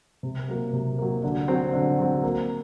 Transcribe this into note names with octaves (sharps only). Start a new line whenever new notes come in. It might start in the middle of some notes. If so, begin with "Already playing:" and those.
C3
F#3 A#3
C3
F#3 A#3
D3
F#3 C4
D3
F#3 C4
A#3